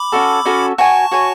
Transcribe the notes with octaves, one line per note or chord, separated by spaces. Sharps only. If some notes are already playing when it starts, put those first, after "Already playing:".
Already playing: B5 D6
C#4 F#4 A4
C#4 F#4 A4
F#4 C#5 G#5 A5 C#6
F#4 C#5 G#5